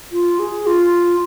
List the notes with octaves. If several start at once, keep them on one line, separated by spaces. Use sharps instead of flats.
F4
G#4
F4